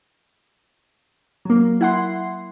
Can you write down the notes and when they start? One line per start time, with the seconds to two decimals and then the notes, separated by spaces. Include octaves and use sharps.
1.45 F#3 A#3
1.81 E4 F#5 C6